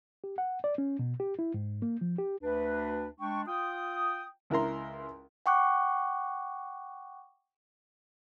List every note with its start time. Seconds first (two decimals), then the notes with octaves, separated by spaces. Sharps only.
0.24 G4
0.38 F#5
0.64 D5
0.78 C#4
0.99 B2
1.20 G4
1.39 E4
1.54 G#2
1.82 A#3
2.01 F3
2.18 G4
2.43 D2 D4 B4
3.19 G#3 D4 G5 C#6
3.47 F4 G5 D#6
4.50 C#2 E4 A#4 A#5 C6
5.46 F#5 G5 C#6 D6 F#6